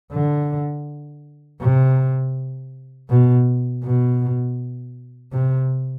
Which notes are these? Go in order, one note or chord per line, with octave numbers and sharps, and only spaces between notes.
D3
C3
B2
B2
C3